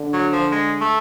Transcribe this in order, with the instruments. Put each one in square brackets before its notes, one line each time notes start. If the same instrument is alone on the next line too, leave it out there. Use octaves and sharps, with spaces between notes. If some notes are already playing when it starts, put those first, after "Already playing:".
Already playing: [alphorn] D3
[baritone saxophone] F#3
F3
G#3
A3